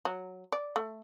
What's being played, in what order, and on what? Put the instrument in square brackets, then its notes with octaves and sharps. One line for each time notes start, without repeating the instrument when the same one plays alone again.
[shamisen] F#3
D5
A3